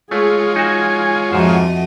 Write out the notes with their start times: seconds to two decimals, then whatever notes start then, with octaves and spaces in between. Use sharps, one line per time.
0.11 G#3 A3 F4 G#4 C#5
0.56 D#4 F#4 G#5
1.33 F2 G#2 A3 F#4 C5 D#5